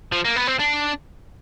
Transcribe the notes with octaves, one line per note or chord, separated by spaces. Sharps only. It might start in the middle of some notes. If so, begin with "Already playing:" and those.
F3
A#3
B3
C4
D4